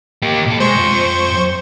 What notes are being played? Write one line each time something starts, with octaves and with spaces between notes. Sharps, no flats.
A#3 G4
B1 A4
G#3 C5 C#6
F2